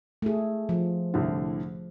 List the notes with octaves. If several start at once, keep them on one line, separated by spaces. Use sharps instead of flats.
A3 G#4
F3
C2 A2 D3